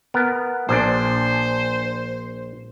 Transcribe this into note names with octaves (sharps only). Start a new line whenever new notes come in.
B3 A#4
A#1 A#2 D4 C5